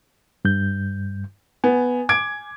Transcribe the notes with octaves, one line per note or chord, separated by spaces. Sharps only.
G2 G6
B3 G#5
D6 G#6 D7